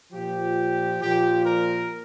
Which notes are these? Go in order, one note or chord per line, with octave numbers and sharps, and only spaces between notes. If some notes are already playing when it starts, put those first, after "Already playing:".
A#2 F3 G4
A#2 F3 G4
A#4